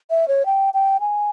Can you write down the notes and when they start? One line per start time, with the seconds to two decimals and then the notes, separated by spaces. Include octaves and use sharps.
0.10 E5
0.28 C#5
0.46 G5
0.74 G5
1.00 G#5